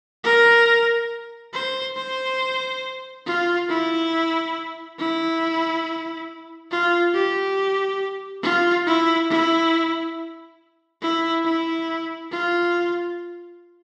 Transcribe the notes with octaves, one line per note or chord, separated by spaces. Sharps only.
A#4
C5
C5
F4
E4
E4
F4
G4
F4
E4
E4
E4
E4
F4